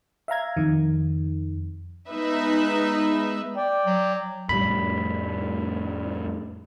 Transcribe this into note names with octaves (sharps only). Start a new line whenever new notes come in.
E5 F5 A#5 G#6
F2 D#3
G#3 B3 D#4 B4 E5
D5 G5
F#3
F2 A2 G3 B5